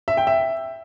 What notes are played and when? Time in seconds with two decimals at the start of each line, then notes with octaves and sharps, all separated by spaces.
0.08 E5
0.17 G5
0.27 E5